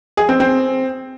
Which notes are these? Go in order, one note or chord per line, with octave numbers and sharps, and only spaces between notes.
G#4
C4
C4